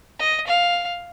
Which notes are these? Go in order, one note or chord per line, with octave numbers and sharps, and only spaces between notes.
D#5
F5